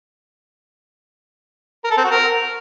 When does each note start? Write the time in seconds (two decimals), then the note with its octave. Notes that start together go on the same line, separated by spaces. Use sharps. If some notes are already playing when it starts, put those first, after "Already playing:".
1.84 A#4
1.91 A4
1.97 C4
2.04 F#4
2.11 A#4